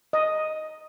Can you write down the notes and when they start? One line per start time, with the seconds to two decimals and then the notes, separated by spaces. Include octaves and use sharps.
0.13 D#5